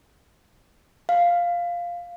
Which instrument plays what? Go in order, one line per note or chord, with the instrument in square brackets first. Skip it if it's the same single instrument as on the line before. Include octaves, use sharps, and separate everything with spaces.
[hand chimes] F5